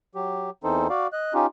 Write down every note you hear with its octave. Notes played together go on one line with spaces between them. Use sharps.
F#3 G4
E2 E3 C4 D#4 A4 C5
F#4 D5 F5
D#5 F#6
C#4 D#4 F4 G4